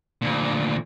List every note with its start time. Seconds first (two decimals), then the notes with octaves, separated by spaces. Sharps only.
0.22 D2 A#2